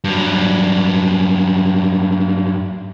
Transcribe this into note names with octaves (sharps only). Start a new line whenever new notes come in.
G2 F#3